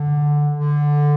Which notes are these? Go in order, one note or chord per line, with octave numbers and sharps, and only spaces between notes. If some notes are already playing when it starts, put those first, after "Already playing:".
Already playing: D3
D3